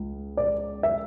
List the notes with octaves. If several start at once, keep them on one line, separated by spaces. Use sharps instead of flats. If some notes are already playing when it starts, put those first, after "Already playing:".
Already playing: C#2
D5
E5